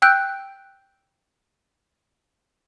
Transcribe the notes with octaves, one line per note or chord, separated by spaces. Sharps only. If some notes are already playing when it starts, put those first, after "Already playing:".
G5 E6 F#6 G6 D7